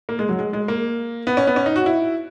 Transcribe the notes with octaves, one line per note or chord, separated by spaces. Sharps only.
A#3
G#3
F#3
G#3
G#3
A#3
B3
C#4
B3
C#4
D#4
F#4
E4